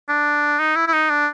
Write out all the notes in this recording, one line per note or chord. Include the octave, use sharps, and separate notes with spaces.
D4
D#4
E4
E4
D#4
D4